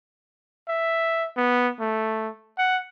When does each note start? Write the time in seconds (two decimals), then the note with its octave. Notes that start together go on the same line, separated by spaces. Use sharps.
0.68 E5
1.37 B3
1.80 A3
2.58 F#5